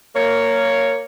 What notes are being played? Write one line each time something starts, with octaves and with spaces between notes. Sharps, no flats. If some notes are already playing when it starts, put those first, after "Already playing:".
A#3 C#5